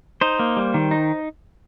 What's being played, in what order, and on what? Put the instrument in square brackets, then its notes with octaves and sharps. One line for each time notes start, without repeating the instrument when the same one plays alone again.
[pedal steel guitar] D#4 C5
A#3
G3
D#3
D#4